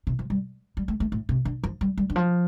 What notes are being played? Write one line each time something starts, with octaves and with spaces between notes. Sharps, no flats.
C3
F3
G3
G3
A3
A3
A2
C3
D3
F3
G3
G3
D3
F3